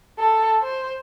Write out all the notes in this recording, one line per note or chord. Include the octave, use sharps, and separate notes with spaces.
A4
C5